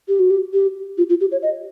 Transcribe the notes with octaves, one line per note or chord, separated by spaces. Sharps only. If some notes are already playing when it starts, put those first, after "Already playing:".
G4
F#4
G4
G4
F4
F4
G4
C#5
D#5